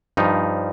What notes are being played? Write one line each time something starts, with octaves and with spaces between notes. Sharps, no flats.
G2 F3 D#4